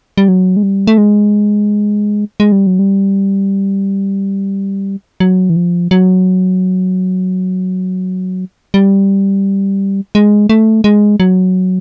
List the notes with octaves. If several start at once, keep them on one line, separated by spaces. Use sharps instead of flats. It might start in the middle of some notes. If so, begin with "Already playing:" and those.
G3
F#3
G#3
G3
A3
G#3
G#3
G3
F#3
G3
F#3
E3
F3
F#3
G3
G#3
A3
G#3
F#3